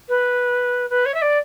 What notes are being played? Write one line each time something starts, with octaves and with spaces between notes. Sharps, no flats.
B4
B4
C#5
E5
D5